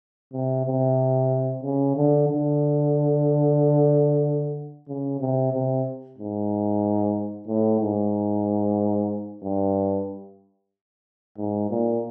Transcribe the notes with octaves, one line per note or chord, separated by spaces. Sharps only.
C3
C3
C#3
D3
D3
C#3
C3
C3
G#2
A2
G#2
G2
G#2
A#2